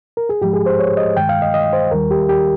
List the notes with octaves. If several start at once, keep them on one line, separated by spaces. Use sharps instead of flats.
A#4
G#4
G#2 F3 G#3 G4
G#4
C5
C#5
D#5
G2 D#3 G#3 G5
F5
D#5
D#5
C5
D#2 D#3 G3 A#4
G4
G4